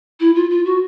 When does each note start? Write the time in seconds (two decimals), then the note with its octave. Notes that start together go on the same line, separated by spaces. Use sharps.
0.20 E4
0.35 F4
0.50 F4
0.65 F#4